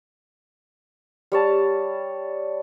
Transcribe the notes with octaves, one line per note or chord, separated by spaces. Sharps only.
G3 C#5 A5